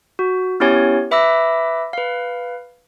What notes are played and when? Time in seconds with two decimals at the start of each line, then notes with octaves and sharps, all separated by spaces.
0.19 F#4
0.60 B3 C#4 E4 G4 C#5 G#5
1.11 B4 E5 B5 D6 E6 A#6
1.93 B4 F5